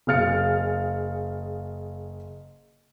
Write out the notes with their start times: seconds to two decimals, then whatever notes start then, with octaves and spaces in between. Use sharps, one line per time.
0.07 F#1 G#4 F5 F6 A6 C#7